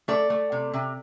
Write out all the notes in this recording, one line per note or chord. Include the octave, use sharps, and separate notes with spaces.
A3 A4 D5
A3
C3
C3